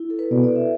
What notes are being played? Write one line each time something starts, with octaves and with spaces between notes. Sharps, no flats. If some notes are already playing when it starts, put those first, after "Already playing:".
Already playing: E4
A4
B4
B2 D5
D5
E5